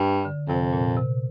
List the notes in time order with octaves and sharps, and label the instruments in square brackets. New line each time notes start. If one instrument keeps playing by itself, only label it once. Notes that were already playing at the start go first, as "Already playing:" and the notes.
Already playing: [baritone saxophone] G2
[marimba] D3
[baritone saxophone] F2 [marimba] C3
[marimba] A#2
C3